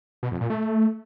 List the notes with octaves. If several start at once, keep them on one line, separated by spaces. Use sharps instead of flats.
B2
F2
A#2
A3